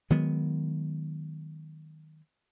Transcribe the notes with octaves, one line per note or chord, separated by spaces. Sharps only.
D#3 F#3 G#3 B3